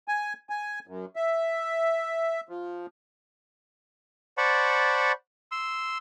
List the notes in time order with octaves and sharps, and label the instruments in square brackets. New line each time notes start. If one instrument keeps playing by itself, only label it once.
[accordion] G#5
G#5
F#2
E5
F3
[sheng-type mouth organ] C5 D5 F#5 A5 B5 C#6
C6 E6